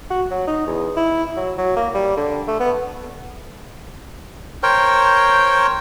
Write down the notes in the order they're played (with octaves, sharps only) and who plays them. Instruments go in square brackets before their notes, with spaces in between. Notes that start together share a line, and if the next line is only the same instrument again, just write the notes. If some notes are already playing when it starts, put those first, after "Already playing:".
[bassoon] F#4
F#3
D#4
E2
E4
F#3
F#3
A#3
G3
D3
A3
B3
[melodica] A#4 C5 C#5 G5